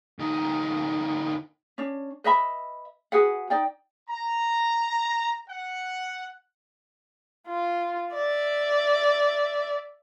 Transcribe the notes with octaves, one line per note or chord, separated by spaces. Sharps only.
D2 D#4
C#4 D4
B4 D#5 E5 B5
F#4 G#4 B4 F#5
D#4 D5 G5
A#5
F#5
F4
D5 E5